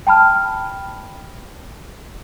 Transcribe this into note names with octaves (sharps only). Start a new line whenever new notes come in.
G5 A5 B5 F6